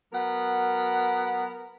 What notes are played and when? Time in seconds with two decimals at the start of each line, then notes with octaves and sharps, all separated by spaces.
0.13 F#3 B3 A#4 F#5